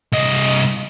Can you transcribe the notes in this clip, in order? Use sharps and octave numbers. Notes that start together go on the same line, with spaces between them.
C2 D#5